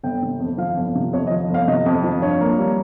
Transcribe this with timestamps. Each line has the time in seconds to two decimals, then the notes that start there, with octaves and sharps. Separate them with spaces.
0.03 G1 G5
0.22 C3
0.40 F2
0.58 F3 F5
0.77 G1
0.95 C3
1.13 F2 C#5
1.27 D#5
1.31 F3
1.50 G1 F5
1.68 C3 D#5
1.86 F2
2.04 F3
2.22 G2 C#5
2.41 A#3
2.58 G3